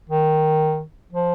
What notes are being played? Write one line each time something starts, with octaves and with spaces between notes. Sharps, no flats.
D#3
F3